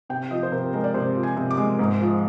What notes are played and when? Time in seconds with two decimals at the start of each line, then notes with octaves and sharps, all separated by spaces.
0.10 C3 G5
0.31 F3 D#5
0.43 C5
0.52 C3 A#4
0.73 G#3 A#4
0.84 D5
0.94 C3 C5
1.15 F3
1.23 G#5
1.37 C3
1.51 D6
1.58 G#3
1.79 G#2
2.00 F3